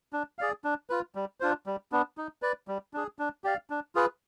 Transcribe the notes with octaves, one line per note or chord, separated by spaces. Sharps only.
D4
G#4 D5 F5
D4
F4 B4
G3
D4 F4 C5
G3
B3 D4
D#4
B4 D5
G3
D4 G#4
D4
G4 D5 F5
D4
F4 G#4 B4